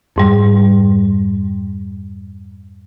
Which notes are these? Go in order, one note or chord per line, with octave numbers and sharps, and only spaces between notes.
F2 G#2 G3